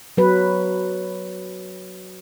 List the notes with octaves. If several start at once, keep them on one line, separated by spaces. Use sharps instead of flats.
F#3 B4